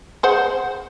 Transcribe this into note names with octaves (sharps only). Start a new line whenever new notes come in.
G#4 C5 F#5